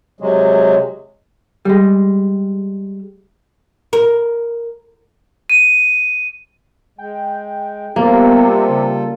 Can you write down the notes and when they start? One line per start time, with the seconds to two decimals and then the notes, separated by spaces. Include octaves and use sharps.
0.20 C3 F#3 G#3
1.65 G3 G#3
3.93 A#4
5.50 D#7
6.98 G#3 G5
7.96 C3 G3 A#3 B3 F4 A4
8.68 C#3